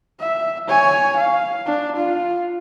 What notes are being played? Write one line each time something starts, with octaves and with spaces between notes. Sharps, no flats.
E5
C#5 G#5
F5
D4
F4